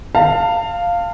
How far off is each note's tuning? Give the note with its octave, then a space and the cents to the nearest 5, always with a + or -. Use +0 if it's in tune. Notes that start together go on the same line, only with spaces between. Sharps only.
F5 +0 A5 +35